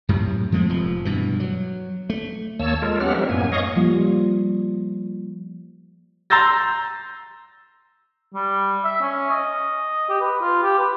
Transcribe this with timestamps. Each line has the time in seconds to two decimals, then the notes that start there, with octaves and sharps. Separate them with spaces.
0.09 F#2 A2 C3
0.52 F3 G#3 A3 C4
0.70 F1 F3
1.05 G2 B2 E3
1.40 F#3
2.10 A3
2.59 D#2 A#3 C#5 A5 E6
2.82 G#3 F4 A4 A#4
3.00 F#3 B3 C#4 G4 F#5 F6
3.14 F3 G3 C4 D#4 A#4 E5
3.29 F#2 A2 A#3 B3 G#5
3.52 C#5 D#5 F5 C#6 D#6
3.76 F3 G3 A#3 F4
6.30 A#5 C6 E6 G6 A6 A#6
8.34 G3
8.84 E5
9.01 C#4
9.31 D#5
10.09 G4
10.21 B4
10.41 F4
10.63 G4
10.79 B4